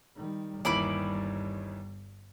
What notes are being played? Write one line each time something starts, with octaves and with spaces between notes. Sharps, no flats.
D#3 G3
G1 D#2 D#3 E3 G3 D5 B5 D6